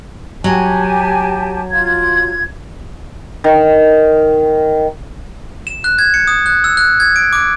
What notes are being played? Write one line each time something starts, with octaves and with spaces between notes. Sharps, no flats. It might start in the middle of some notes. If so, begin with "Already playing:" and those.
F#3 G4 G#5 A5
F4 G#6
D#3
E7
F#6
G#6
C#7
D#6
F#6
E6
F#6
G#6
D7
D6